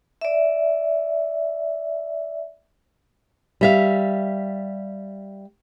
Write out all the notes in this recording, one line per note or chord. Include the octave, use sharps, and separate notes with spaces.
D5 E5
G3 E5 F5